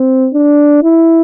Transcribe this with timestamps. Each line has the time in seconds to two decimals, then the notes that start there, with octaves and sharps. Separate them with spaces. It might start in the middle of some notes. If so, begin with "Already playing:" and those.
Already playing: C4
0.34 D4
0.83 E4